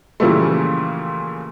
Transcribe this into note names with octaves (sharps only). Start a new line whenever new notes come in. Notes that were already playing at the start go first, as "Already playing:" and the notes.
A#2 C#3 E3 F3 G3 A3